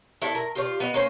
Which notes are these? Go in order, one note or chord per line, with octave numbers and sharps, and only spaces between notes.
E4 A4 C#5 D5
A#4
F4 G4 C#5 D5
B3 D#5
A#3 C#4 C5